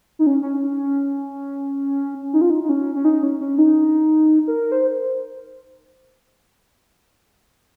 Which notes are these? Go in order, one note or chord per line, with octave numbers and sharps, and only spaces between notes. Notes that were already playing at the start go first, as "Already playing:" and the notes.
D#4
C#4
C#4
D#4
F4
D#4
D#4
C#4
C#4
D#4
C#4
C#4
D#4
A#4
C5